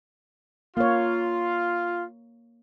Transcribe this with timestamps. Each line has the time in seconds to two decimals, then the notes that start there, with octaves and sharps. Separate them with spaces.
0.77 A#3 F4 C#5